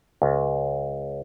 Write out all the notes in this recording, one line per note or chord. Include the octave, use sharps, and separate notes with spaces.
C#2